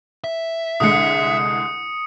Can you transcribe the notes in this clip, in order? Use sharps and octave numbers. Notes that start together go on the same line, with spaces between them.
E5
C2 D3 G#3 D#6 C#7